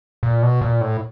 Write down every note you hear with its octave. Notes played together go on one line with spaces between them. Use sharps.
A#2
B2
A#2
A2